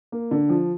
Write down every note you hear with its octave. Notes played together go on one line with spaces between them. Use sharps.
A#3
D3
F3